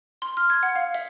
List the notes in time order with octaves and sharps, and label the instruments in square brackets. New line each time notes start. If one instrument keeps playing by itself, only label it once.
[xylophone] C6
F6
G#6
F#5
F5
E5